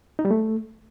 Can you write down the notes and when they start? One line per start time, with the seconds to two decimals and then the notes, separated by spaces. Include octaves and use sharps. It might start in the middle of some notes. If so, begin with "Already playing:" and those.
0.19 D#4
0.25 G3
0.31 A3